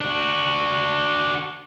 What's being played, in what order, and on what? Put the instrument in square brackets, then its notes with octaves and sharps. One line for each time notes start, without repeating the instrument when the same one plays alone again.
[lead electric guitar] D4 F#4